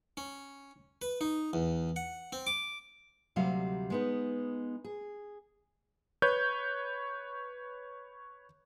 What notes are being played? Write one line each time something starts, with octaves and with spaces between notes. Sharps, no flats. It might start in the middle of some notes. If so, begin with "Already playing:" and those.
C#4
B4
D#4
E2
F#5
C4
D6
D2 C3 F#3 G3 F5
G#3 B3 D#4
G#4
B4 C#5 G6